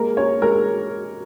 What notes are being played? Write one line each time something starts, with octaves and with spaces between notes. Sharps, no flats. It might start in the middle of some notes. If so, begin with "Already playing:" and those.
Already playing: G#3 A#3 A#4
C#4 C#5
G#3 A#4